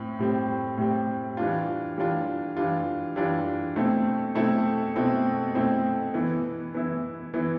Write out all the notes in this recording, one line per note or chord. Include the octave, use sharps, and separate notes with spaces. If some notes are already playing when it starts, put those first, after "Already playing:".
Already playing: A2 C4
A2 G3 C4
A2 G3 C4
E3 G3 D4 F4
E3 G3 D4 F4
E3 G3 D4 F4
E3 G3 D4 F4
B2 A3 C4 E4 A4
B2 A3 C4 E4 A4
B2 A3 C4 E4 A4
B2 A3 C4 E4 A4
E3 B3 E4
E3 B3 E4
E3 B3 E4